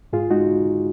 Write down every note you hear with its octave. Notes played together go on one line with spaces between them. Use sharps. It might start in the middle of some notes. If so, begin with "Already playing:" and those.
G#2 F4 G#4
G#3 D#4 F#4